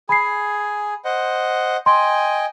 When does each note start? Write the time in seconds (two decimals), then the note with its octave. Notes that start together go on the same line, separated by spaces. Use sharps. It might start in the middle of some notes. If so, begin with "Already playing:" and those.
0.09 G#4 G#5 B5 C7
1.05 C5 D#5 F#5
1.86 D#5 G5 G#5 C6